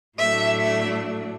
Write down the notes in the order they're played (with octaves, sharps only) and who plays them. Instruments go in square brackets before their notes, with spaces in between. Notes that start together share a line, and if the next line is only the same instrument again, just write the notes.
[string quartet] A2 F#3 A3 D4 E5
E5